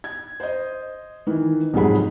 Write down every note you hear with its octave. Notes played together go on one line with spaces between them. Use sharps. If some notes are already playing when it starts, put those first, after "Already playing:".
G#6
C5 D#5
D#3 E3
C2 F2 G#2 F#3 G#4 B5